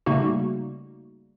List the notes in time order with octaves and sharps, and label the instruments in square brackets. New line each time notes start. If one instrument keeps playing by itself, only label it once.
[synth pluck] C#3 G3 A3 A#3 D#4 F#4